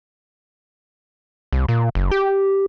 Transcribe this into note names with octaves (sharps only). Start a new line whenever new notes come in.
C2
A#2
F#1
G4